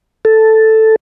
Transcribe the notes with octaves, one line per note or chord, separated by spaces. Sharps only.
A4